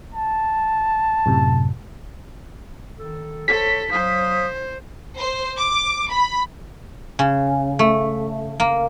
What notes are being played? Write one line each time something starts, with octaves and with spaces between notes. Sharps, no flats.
A5
F#2 A2 C3
D#3 A4
A4 C5 C#5 B6
F#3 C5 F5 D#6
C5
D6
B5
C#3
A3
A#3